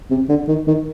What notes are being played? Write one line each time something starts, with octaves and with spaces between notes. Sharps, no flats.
C3
D3
D#3
D#3